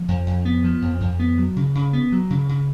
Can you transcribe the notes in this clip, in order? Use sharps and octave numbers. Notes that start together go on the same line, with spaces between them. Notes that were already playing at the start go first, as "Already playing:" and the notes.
Already playing: F3
F2
F2
B3
F3
F2
F2
B3
F#3
C#3
C#3
B3
F#3
C#3
C#3